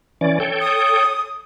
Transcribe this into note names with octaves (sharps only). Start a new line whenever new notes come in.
E3 C#4 D5
A4 C#5 G5
D#6